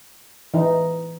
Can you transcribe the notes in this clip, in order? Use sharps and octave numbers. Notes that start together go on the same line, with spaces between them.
E3 D#4